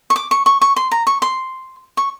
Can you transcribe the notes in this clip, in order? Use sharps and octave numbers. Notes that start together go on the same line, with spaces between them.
C#6
D6
C#6
C#6
C#6
C6
A#5
C#6
C6
C#6